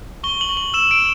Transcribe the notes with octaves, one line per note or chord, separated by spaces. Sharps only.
C#6 G7
F#7
C#6
F#7
E6 E7
D7